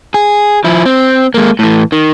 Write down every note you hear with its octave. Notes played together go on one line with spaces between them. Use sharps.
G#4
F3 E4
C4
G#3 A#3
A2 E3
D#3